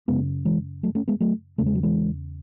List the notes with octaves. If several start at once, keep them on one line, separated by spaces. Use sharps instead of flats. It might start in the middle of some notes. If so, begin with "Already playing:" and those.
F#2 C#3 G#3 B3
E3 G#3
F#3 A3
A3 C#4
G#3 B3
F#3 A3
E2 C#3 A3
G#3
F#3
E3 G#3